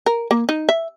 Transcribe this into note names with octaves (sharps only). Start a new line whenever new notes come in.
A#4
A#3
D#4
E5